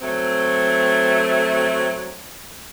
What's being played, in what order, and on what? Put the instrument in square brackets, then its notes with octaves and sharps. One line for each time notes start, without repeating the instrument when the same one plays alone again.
[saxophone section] F#3 A3 C4